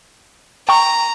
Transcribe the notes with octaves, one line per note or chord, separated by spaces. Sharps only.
G5 A#5 C#6